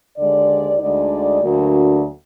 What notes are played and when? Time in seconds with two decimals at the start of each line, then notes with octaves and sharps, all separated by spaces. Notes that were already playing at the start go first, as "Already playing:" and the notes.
0.17 D#2 D3 G#3 D5
0.79 D2 D3 G#3 D#4 D5
1.40 D2 D3 F#3 A#3 D4 F#4